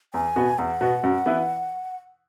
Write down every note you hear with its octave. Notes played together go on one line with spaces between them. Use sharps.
E2 G#5
B2 B3 F#4
E2 F#5
B2 B3 F#4
F#2
E3 B3 E4 B4